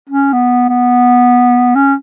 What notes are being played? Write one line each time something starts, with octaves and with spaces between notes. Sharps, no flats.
C#4
B3
B3
C#4